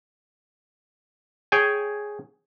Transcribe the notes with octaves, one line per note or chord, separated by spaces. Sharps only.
G#4 C#5 G5 G#5